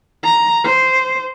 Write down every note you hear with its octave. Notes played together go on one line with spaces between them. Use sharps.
A#5
C5